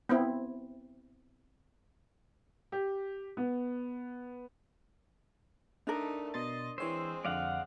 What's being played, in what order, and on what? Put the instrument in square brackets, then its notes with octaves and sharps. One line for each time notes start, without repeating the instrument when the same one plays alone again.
[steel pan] B3 C4 E4
[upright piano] G4
B3
[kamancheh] A3 D#4 [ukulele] D4 A#4
[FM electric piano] B2 C6 A6 [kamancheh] D#5
[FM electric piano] E3 C#5 E6 [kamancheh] G#3 C4 [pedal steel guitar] C5
[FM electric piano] F2 D3 [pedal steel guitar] D5 F5 F#5